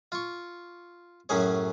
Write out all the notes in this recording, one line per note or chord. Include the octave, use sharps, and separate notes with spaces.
F4 C#6
F#2 A2 F#3 C#4 G#4 C#5